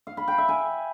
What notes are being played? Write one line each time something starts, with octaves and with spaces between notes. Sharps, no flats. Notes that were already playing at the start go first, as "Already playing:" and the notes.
F5
B5
G5
E5
G#5